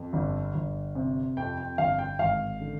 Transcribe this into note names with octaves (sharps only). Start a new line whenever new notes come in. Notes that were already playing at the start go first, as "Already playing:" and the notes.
Already playing: F2
G1
G1
C3
F2 G5
G5
G1 F5
G5
G#1 F5
D3